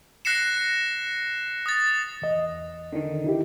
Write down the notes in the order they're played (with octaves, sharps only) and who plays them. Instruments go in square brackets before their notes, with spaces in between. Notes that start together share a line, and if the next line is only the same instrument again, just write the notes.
[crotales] F#6 A#6 C7 C#7 E7
D#6 A6
[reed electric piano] E2 D#5
[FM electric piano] D3 D#3
[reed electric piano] D#4 E4 G4